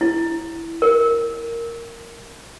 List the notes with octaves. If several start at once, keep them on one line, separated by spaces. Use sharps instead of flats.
E4
A#4